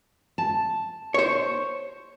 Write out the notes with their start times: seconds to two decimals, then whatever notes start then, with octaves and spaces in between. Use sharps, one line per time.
0.38 A5
1.14 C5 C#5